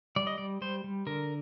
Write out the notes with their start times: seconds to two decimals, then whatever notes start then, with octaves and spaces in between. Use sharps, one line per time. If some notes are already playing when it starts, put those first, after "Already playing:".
0.16 G3 D5
0.27 D#5
0.38 G3 D5
0.61 G3 C5
0.84 G3
1.07 D3 A#4